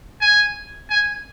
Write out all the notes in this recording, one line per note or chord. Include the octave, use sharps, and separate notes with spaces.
G#5
G#5